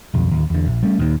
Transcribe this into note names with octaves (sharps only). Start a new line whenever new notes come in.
B1 F2
D1 D#2
E2 D3
A#1
G3 A3 C#4
D#1 D#2 G#2 D#3